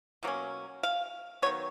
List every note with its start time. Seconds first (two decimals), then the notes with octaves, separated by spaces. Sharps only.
0.23 B2 F#3 A#3 C#4
0.83 F5
1.42 D#3 F#3 B3 C#5